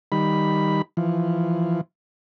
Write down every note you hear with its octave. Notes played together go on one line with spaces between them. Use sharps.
D#3 G3 B5
E3 F3